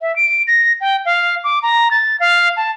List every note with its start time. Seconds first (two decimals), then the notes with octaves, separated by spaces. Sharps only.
0.01 E5
0.16 D7
0.47 A#6
0.81 G5
1.05 F5
1.44 D6
1.63 A#5
1.91 A6
2.20 F5
2.57 A5